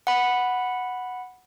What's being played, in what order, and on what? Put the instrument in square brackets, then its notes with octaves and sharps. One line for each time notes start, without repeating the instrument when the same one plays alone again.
[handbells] F#5 B5